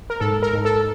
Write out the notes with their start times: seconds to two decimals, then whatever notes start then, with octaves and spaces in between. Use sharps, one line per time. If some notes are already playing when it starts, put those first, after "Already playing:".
0.10 A#4
0.20 G#2 A4
0.43 A#4
0.53 G#2
0.65 A4